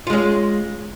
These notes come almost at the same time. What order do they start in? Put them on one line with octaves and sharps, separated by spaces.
F4 G#3 C#4